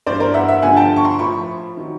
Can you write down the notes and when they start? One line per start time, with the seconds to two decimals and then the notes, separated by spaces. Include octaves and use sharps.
0.07 G2 E3 C5 D5
0.20 A#4 C5
0.34 E5 F#5
0.48 E5 F#5
0.62 G2 D3 F3 F#5 G#5
0.76 G5 A5
0.96 C#6
1.05 A#5 C6
1.18 A2 F3 B5 C#6
1.77 D#3 F#3